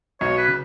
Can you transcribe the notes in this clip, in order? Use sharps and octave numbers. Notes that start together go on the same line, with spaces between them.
B1 B2 C#5
B4
C#3